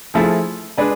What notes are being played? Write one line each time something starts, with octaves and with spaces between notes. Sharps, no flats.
F3 A3 E4 G#4
G#3 D4 G#4 B4